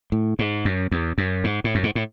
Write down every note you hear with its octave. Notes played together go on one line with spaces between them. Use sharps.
A2
G#2
F#2
E2
F#2
G#2
A2
F#2
G#2
A2